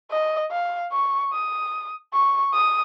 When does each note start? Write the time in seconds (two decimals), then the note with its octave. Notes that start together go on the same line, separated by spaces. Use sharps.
0.11 D#5
0.51 F5
0.92 C#6
1.33 D#6
2.13 C#6
2.53 D#6